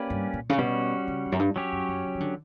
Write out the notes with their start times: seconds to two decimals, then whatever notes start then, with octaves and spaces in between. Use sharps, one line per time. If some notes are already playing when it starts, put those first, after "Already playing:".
Already playing: A#3 C#4 G4 B4 D5
0.10 G2
0.33 A#2
0.49 C#3
0.58 B2 G3 C#4 F#4
1.08 C#3
1.25 E2
1.32 F#2
1.39 G2
1.55 E2 F#3 C#4 G4 C#5
1.72 F#2
1.89 F#2
2.05 C#3
2.15 E3
2.20 D3